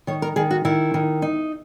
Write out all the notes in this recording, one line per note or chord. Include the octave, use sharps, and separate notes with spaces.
D#3 C#5
A#4
D#3 G#4
F#4
D#3 E4
D#3
D#4